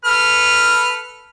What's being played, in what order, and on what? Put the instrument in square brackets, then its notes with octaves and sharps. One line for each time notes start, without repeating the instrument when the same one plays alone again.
[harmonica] A4 B4 F6